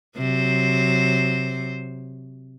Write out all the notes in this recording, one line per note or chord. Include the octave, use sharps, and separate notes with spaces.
C3 F#3 C5